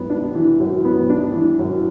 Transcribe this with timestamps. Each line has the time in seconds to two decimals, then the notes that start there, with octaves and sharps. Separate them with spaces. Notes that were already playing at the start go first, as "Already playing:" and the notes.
Already playing: F#2 B3
0.10 D4
0.35 E3
0.60 F#2
0.85 B3
1.10 D4
1.34 E3
1.59 F#2